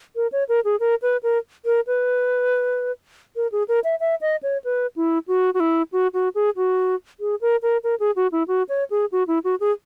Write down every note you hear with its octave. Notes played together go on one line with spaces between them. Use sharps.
A#4
C#5
A#4
G#4
A#4
B4
A#4
A#4
B4
A#4
G#4
A#4
E5
E5
D#5
C#5
B4
E4
F#4
F#4
E4
F#4
F#4
G#4
F#4
G#4
A#4
A#4
A#4
G#4
F#4
E4
F#4
C#5
G#4
F#4
E4
F#4
G#4